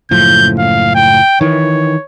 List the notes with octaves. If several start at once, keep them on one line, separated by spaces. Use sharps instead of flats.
F#1 A2 F3 G6
F5
G5
D#3 E3 C#5